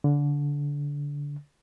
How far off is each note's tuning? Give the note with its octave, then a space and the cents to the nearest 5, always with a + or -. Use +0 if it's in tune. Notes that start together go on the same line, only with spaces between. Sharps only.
D3 -20